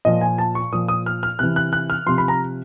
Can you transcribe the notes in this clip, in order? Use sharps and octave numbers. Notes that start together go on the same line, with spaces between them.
A#2 F3 D#5
G#5
A5
C#6
A#2 F3 D#6
D#6
F6
F6
C3 E3 F#6
F#6
F#6
F6
C3 F3 C6
B5
A#5